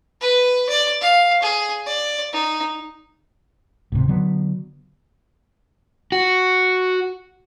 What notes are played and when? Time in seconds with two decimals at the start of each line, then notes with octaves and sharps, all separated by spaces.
0.21 B4
0.69 D5
1.01 F5
1.42 G#4
1.86 D5
2.32 D#4
3.92 D1 G#2 C3
4.08 D3 F#3 B3
6.12 F#4